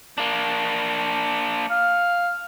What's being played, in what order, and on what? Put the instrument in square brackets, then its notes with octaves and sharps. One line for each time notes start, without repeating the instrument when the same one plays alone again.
[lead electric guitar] A#3 D4
[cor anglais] F5